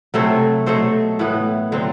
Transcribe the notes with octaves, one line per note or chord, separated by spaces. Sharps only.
C3 F#3 A3 E4 A4 C5
B2 F#3 A3 A4 C5
A2 E3 B3
D3 F#3 C4